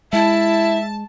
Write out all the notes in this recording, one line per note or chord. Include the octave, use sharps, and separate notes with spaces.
G#3 E4 E5 A5